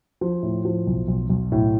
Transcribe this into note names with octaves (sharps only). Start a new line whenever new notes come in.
F3
A2
F3
B1
B1
B1
A2